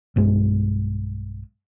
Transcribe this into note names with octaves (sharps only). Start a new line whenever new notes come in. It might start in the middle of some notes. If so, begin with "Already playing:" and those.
B1 G2 G#3